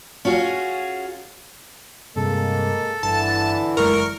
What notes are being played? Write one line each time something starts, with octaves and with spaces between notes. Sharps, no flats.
C#4 F4 F#4 G#4
G2 C3 G#3 A#3 A4
G1 D3 E3 A5
F#1 C#3 G#3 A#4 A#5 C#6 F6